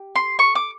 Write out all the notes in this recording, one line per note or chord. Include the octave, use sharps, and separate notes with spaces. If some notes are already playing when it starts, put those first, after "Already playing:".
Already playing: G4
C6
C#6
D6